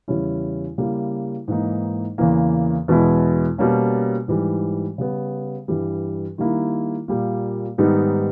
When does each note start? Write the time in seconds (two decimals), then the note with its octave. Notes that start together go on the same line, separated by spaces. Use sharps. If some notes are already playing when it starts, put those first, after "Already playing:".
0.08 E2 C#3 G3 C#4 E4
0.78 C#3 G3 A#3 E4
1.48 G#2 E3 A#3 D#4
2.18 E2 C#3 E3 A#3
2.88 E2 B2 G#3 B3 E4
3.58 B2 G3 A#3 C#4
4.28 G#2 E3 G3
4.98 C#3 G3 B3
5.68 G2 E3 G3
6.38 D#3 G3 A#3 E4
7.08 A#2 G3 A#3
7.78 G#2 D#3 G3 B3 D#4